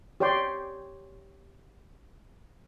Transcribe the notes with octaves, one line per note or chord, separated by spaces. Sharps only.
G4 C#5 D5 G5 C6